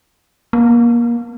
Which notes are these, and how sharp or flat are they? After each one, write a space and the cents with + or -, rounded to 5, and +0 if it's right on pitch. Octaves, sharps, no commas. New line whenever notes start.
A#3 +25